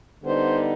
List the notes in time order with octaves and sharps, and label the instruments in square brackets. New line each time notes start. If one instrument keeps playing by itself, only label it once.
[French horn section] D3 G3 B3 D#4 C5